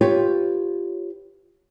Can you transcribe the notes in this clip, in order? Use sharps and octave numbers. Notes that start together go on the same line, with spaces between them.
F4 G4 B4 C#5